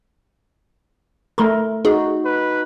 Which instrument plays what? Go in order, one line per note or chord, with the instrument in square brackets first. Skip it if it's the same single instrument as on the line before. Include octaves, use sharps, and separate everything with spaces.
[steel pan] A3 A#4 [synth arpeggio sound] B5 C6
[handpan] D#4 F#4 [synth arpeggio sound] G#4
[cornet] B4